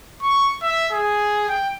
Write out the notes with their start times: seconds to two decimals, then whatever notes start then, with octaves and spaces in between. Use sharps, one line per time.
0.22 C#6
0.62 E5
0.92 G#4
1.48 G5